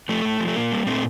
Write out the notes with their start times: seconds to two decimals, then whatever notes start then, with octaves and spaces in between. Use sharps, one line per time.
0.09 F3 A3
0.25 A2
0.40 F3
0.47 A3
0.55 A#2 A#3
0.72 G3
0.86 A#2 A3 C4